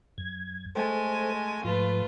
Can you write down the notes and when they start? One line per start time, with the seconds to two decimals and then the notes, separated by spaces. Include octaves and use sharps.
0.18 F#2 G#6
0.75 G#3 A3 A4 C5 G#5
1.65 G#2 F3 A3 F4 B4